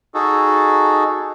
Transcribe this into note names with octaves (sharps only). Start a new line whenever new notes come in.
D#4 F#4 G#4 A4